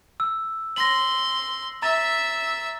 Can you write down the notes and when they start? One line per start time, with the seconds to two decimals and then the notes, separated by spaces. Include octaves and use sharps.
0.20 E6
0.76 C6 A#6 F#7
1.82 E5 A#5 E6 A6